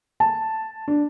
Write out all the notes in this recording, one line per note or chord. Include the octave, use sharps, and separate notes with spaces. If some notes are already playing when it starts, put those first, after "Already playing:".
A5
D4